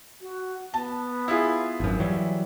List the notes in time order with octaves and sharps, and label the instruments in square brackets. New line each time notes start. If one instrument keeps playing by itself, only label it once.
[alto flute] F#4
[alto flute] B3 [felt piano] A5
[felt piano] E4 F4 G#4
[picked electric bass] G#1 F#2
E3 F#3 G3